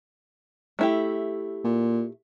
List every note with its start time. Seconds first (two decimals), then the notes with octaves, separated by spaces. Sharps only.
0.79 A3 E4 G4
1.65 A#2